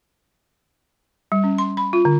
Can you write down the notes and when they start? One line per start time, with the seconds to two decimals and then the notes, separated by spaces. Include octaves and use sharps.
1.32 G3
1.44 C#4
1.58 C6
1.77 B5
1.93 F4
2.05 D3